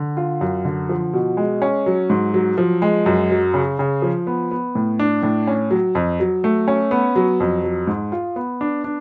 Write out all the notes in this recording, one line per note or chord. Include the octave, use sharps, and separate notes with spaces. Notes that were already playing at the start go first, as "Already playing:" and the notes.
Already playing: D3
F4
F#2
D3
F3
B2
G#3
C#4
F#3
G#2
F#3
F3
G#3
F#2
F#3
C#3
C#3
F3
B3
B3
A2
D4
A2
C#4
F#3
F2
F#3
A3
C#4
B3
F#3
F2
F#3
G#2
F4
B3
D4
D4